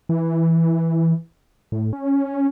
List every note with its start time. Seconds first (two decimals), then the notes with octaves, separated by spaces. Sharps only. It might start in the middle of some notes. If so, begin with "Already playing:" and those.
0.09 E3
1.72 A2
1.93 C#4